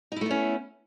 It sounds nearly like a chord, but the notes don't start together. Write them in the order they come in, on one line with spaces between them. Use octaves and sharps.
D#4 E4 A3 B3 C#4